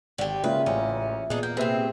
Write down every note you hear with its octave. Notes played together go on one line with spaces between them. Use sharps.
G#1 D3 G4
C#3 G#3 A#3 F4 B4 E5
A1 C#4
A#2 B3 D4 D#4 G#4
A#3 G6
C3 A#3 C4 G#4 B4 C5 E5